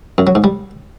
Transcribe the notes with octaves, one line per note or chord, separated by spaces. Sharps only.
F#2
F#3
G#2
G3